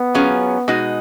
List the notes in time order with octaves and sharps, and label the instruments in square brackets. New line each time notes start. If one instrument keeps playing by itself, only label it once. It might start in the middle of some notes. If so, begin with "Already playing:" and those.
Already playing: [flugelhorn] B3
[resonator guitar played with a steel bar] F#3 C#4 F4 G#4
B2 G#3 D#4 F#4